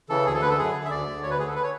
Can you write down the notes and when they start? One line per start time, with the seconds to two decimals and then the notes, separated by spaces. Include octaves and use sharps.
0.09 C#3 E3 A4
0.26 D2 G#4
0.34 A4
0.42 D3 B4
0.50 A4
0.58 F#2 G#4
0.74 D3
0.85 E5
0.90 D2 D5
1.06 D3
1.23 D2 C#5
1.31 B4
1.39 D3 G#4
1.47 A4
1.55 B4
1.63 C#5